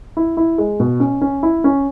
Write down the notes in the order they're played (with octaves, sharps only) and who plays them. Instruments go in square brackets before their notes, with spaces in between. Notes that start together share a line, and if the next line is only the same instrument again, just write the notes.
[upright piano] E4
E4
G#3
B2
C#4
C#4
E4
C#4